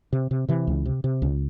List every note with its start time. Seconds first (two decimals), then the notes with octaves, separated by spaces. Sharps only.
0.13 C3
0.31 C3
0.49 C3 E3
0.67 C#2
0.85 C3
1.04 C3
1.22 C#2